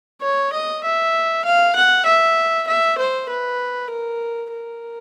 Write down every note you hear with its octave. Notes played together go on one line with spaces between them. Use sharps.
C#5
D#5
E5
F5
F#5
E5
E5
C5
B4
A#4
A#4